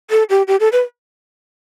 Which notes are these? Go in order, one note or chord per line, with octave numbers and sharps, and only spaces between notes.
A4
G4
G4
A4
B4